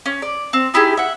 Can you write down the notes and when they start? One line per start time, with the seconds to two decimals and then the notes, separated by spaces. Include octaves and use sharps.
0.06 C#4
0.22 D5
0.53 C4
0.74 D#4 E4 G4 G#4
0.97 E5 F#5